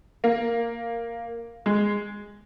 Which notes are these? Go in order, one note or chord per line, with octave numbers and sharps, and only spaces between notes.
A#3
G#3